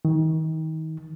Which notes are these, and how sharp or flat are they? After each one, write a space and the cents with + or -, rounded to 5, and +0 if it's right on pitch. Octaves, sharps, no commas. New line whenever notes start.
D#3 +30